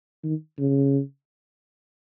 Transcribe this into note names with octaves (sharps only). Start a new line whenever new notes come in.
D#3
C#3